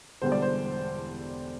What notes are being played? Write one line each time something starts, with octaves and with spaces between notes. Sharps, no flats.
E1 E2 D3 G3 C5
D5
C5